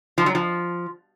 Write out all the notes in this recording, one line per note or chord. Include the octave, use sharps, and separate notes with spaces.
F3
F#3
F3